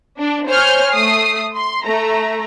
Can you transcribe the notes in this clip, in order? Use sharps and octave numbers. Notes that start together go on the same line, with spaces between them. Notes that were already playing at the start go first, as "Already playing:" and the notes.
D4
C5 C#5 G#5 F6 G6
A3 D#6 C7
C6
A3 A#5